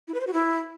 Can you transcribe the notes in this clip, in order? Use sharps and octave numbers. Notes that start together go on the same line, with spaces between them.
E4
B4
C5
F#4
E4